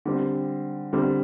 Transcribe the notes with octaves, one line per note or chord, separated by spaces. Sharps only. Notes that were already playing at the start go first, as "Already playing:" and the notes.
D3 G3 C4
D3 G3 C4